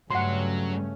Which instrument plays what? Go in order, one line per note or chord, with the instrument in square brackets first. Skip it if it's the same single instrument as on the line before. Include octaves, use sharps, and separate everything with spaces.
[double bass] G2 [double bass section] C#3 A3 C#4 [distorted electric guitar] F#3 [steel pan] F#5 C6